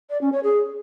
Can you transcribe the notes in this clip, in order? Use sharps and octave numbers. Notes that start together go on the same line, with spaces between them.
D5
C#4
C#5
G#4